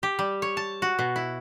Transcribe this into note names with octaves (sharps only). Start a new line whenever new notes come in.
G4
G3
C#5
A5
F#4
B2
E4